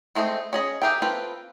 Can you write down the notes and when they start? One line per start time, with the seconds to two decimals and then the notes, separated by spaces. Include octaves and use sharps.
0.15 G#3 A3 C4 C5 D#5
0.53 C#4 G#4 D#5
0.82 G4 G#4 A#4 E5 G5
1.02 C4 F4 A4 B4 G5